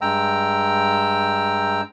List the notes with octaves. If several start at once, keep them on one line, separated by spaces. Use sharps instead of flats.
G2 G#3 G5 A#5 E6